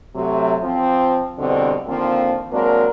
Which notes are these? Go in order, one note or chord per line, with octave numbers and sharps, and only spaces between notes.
C3 F#3 A3
F3 C4
E2 G2 B2 D3 C4
D3 D#3 F3 A#3 C4
F#3 G#3 A#3 C4 D4 A#4